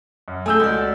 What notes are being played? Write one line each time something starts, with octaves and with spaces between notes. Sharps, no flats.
F#2
A3 G#4 G#5 E6 G6
C#2 F#4 D5